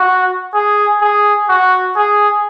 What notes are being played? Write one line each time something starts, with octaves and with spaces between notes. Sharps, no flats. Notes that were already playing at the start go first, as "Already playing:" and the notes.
Already playing: F#4
G#4
G#4
F#4
G#4